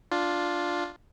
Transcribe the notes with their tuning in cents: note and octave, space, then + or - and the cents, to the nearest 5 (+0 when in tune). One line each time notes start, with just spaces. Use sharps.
D4 +0 F4 +5